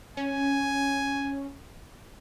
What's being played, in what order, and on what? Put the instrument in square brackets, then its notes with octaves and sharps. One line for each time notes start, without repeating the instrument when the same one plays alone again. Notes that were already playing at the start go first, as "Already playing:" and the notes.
[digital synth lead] C#4 [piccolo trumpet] G#5